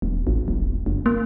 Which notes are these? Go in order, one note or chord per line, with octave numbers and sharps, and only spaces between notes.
D#1
A1
D#1
F#1
A#3